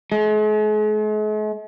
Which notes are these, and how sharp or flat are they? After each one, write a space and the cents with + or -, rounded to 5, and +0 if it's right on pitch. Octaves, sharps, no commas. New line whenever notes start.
G#3 +45